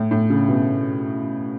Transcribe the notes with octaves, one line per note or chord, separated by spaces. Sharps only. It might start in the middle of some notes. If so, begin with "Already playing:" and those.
Already playing: A2
A2
C#3
B2